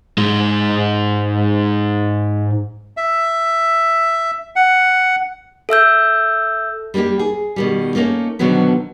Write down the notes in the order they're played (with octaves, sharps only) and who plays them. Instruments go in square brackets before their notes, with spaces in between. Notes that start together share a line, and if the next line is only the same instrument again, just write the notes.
[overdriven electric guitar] G#2 G#3
[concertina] E5
F#5
[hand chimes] A4 E5 E6 G6
[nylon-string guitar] G3 A#3 D4 D#4 G4
G#4
B2 D#3 G3
A3 A#3 C#4 D#4
B2 D3 D#3 F3 F#3 B3